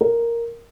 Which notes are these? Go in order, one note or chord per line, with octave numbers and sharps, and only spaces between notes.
A#4